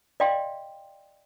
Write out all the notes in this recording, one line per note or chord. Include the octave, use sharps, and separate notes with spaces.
D5 D#5 F5 G5 C6